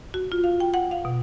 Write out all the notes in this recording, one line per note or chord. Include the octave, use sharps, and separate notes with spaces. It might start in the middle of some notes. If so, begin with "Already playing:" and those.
F#4
F4
F5
G5
F#5
F5
B2